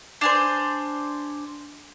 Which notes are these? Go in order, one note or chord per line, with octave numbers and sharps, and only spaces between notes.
D4 G#4 C5